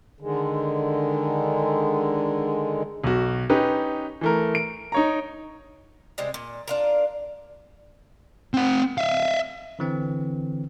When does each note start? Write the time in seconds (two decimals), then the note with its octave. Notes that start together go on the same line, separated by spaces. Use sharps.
0.20 D3 D#3 G#3
3.04 B1 F#4
3.49 C#4 D#4 G4 B4
4.21 E3 A3 A#4
4.55 D7
4.92 D#4 C#5 A#5
6.18 C3 G3 G#3 C4
6.34 A#2
6.68 D4 F4 A#4
8.54 C4 F#5
8.98 E5 F5
9.79 D3 E3 C4